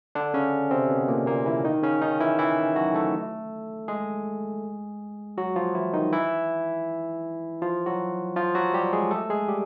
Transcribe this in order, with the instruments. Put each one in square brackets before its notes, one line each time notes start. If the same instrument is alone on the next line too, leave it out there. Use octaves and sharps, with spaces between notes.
[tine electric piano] D3 D4
C#3 C#4
C3 C4
B2 B3
A#2 A#3
A#2 A#3
E3 E4
D#3 D#4
C#3 C#4
D#3 D#4
E3 E4
E3 E4
F#3 F#4
A3 A4
G#3 G#4
F#3 F#4
F3 F4
E3 E4
D#3 D#4
E3 E4
F3 F4
F#3 F#4
F3 F4
F#3 F#4
G3 G4
G#3 G#4
A3 A4
G#3 G#4
G3 G4